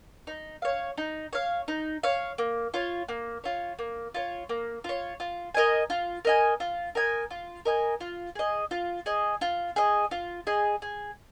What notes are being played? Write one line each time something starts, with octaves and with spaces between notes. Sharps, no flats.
D#4
C#5 F5
D#4
C#5 F5
D#4
C#5 F5
A#3
F4 C#5
A#3
F4 C#5
A#3
F4 C#5
A#3
F4 C#5
F4
A#4 D#5 G#5
F4
A#4 D#5 G#5
F4
A#4 D#5 G#5
F4
A#4 D#5 G#5
F4
G#4 D#5
F4
G#4 D#5
F4
G#4 D#5
F4
G#4 D#5
G#4